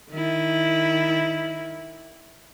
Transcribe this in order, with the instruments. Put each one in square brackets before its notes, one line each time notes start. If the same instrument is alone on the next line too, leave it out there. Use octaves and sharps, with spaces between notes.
[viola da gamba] D#3 E4